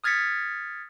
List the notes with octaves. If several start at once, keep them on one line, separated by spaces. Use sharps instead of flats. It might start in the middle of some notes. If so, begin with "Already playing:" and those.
D#6 F6 G#6 A6 B6 C#7